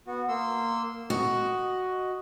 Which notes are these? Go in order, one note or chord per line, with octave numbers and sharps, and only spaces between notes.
B3 F#4
A#3 C6 E6
F#4 D#5